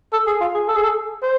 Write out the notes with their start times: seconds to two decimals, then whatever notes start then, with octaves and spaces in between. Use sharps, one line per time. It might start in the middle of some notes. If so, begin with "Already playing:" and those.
0.13 A4
0.27 G#4
0.41 F4
0.54 G#4
0.68 A4
0.76 G#4
0.84 A4
1.23 C5